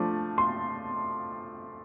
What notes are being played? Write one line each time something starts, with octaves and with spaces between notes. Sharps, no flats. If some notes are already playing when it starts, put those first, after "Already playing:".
Already playing: F3 A3 D4
C6